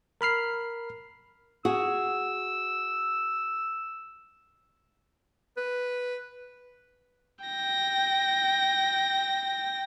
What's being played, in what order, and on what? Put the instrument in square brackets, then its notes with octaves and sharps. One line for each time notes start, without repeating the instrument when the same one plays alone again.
[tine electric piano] A#4 B5 F6 C7
[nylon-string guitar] F#4 G#4 [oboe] E6
[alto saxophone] B4
[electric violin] G5 A#6